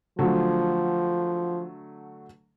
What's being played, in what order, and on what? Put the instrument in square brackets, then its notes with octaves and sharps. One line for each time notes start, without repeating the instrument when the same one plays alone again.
[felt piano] D3 F#3 A3 [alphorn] F3